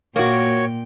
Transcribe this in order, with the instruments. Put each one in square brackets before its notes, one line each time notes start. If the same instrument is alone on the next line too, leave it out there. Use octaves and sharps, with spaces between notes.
[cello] A#2 G5 [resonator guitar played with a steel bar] A#3 F#4 [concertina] C#5